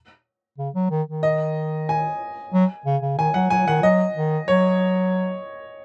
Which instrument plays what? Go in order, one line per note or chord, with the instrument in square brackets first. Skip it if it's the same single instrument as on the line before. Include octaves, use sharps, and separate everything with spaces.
[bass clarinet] C#3
F#3
D#3
D#3
[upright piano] D#5
G#5
[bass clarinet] F#3
C#3
C#3
[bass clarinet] D#3 [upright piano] G#5
[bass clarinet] F#3 [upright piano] F#5
[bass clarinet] F#3 [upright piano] G#5
[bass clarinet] D#3 [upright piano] F#5
[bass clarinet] F#3 [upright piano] D#5
[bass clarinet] D#3
[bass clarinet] F#3 [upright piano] C#5